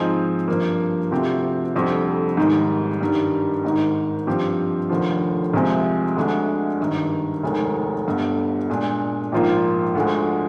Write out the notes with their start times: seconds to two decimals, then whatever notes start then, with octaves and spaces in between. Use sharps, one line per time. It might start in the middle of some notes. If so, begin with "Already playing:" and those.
Already playing: G#2 F3 C4 D#4 G#4
0.48 G2 F3 A#3
1.11 D2 C3 F3 C4 G4
1.75 F1 F2 D3 G3 C4
2.37 G#1 G#2 D#3 G3
3.01 G2 D#3 G3
3.64 G#1 G#2 D#3
4.27 G2 F3 C4 G4
4.90 F1 D#2 D3 F3
5.53 C2 C3 F3 G#3 C4
6.16 D2 D3 G#3 D4
6.80 G#1 G2 D#3
7.43 F1 D#2 D#3 G#3
8.07 G1 G2 D3
8.70 A#2 G#3 D4
9.32 A#1 G#2 F3 A#3 F4
9.95 D2 D3 F3 G#3